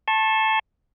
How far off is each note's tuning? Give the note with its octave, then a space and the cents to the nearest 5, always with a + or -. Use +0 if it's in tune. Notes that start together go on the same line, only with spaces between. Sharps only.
A5 +0 C#6 -40